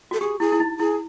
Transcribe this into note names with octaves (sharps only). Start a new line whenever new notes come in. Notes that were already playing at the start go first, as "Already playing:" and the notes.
F#4 A4
G4 G#4
E4 G#4
E4
D#4
E4 G#4